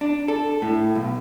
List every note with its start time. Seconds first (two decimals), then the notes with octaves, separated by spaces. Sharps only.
0.01 D4
0.28 A4
0.62 A2
0.95 B1